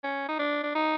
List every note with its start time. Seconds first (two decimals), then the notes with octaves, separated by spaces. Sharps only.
0.04 C#4
0.28 D#4
0.39 D4
0.63 D4
0.75 D#4